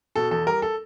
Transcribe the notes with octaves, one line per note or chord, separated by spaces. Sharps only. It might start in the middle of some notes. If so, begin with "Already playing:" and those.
B2 A4
E2 A4
G3 A#4
A4